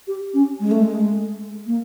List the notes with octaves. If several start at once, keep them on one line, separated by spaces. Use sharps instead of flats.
G4
C#4
G#3
A3
G#3
A#3